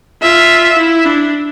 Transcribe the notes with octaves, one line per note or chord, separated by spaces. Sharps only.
F4 E5
E4
D4